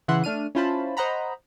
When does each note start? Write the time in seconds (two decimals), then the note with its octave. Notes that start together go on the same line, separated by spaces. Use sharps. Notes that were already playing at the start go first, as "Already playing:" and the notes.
0.08 C#3 E3 E5 F#5 C6 F#6
0.24 A3 D4 F6 D#7
0.55 C#4 E4 F4 C5 A5 B5
0.97 C5 D#5 F#5 A#5 B5